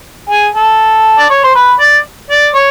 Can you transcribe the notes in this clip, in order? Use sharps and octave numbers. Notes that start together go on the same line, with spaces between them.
G#4
A4
D5
C#5
C5
B4
D5
D5
C#5